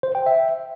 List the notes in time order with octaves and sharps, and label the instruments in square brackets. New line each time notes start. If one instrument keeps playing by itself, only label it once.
[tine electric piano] C5
G5
E5